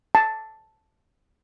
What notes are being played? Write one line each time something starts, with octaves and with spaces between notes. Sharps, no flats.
A5